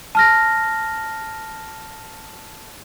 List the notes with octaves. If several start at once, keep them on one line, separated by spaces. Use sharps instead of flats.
A5 F6 A#6